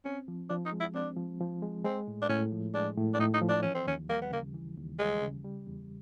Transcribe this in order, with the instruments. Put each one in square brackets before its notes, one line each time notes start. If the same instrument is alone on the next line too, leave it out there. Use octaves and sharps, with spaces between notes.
[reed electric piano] C4 [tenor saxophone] C#4
[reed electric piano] F3
[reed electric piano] F3 [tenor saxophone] D4
[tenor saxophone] D#4
[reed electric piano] G#3
[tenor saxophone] E4
[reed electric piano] C4 [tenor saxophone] D4
[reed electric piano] F3
F3
G#3
[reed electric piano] G#3 [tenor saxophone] C4
[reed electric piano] A2
[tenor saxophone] D4
[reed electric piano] A2 [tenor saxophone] C#4
[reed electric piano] F3
[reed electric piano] G#3 [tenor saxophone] D4
[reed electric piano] A2
[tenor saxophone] D4
[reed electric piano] A2 [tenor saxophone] D#4
[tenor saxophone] D#4
[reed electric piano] F3
[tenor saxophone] D4
[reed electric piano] E3 [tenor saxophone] C#4
[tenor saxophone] C4
[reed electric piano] D#2 [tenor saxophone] C#4
[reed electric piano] G3 [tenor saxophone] A#3
[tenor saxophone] B3
[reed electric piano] C#3 [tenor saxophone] A#3
[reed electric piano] E3
D#2
[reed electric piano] G3 [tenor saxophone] G#3
[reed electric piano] C#3
G3
E2